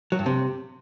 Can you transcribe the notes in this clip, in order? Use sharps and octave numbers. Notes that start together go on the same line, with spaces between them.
F#3
G2
C3